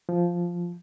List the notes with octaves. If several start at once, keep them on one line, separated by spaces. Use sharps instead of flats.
F3